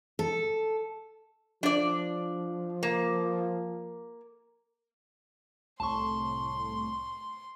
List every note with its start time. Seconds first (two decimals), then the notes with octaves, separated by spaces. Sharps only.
0.19 A4
1.63 F3 D4 D5
2.83 A#3
5.80 C2 A2 A5 C6 C#6